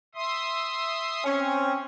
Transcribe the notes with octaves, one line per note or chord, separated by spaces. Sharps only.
E5 C6 D#6
C4 C#4